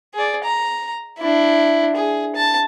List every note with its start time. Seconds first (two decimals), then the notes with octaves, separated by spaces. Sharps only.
0.14 G#4 D5
0.44 A#5
1.19 D4 E4
1.96 G#4
2.36 A5